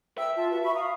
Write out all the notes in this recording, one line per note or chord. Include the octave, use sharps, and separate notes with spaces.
E5 G5 E6
F4 A5
F#4 B4
B5 C#6
F5 A#5 D#6